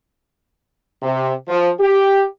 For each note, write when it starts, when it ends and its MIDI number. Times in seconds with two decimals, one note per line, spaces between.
1.02 1.33 48
1.48 1.69 53
1.80 2.25 67